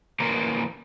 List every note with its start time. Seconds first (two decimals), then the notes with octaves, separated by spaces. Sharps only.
0.20 E3 A#3 C#4 A#4 C5 D5